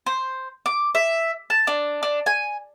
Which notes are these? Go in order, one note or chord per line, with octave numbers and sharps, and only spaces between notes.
C5
D6
E5
A5
D4
D4
G#5